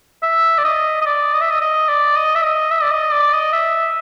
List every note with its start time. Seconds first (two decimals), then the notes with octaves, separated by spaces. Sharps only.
0.23 E5
0.58 D5
0.64 D#5
1.01 D#5
1.06 D5
1.33 D#5
1.41 E5
1.50 D#5
1.61 D#5
1.88 D5
2.16 D#5
2.35 E5
2.44 D#5
2.71 E5
2.82 D5
2.91 D#5
3.12 D5
3.33 D#5
3.53 E5